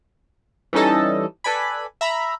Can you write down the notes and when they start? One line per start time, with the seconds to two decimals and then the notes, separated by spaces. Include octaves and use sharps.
0.73 E3 G3 C#4 D#4 A4 D#5
1.44 A4 B4 D5 G#5 B5
2.01 E5 A#5 B5